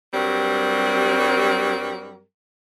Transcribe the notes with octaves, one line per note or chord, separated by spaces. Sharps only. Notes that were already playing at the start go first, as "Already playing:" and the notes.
G2 F#3 G3 C4 A#4